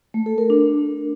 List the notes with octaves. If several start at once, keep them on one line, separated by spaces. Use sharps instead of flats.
A3
A4
A#4
D4